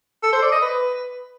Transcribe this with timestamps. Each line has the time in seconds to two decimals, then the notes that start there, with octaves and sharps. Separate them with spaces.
0.23 A4
0.33 C5
0.43 D5
0.52 D#5
0.62 B4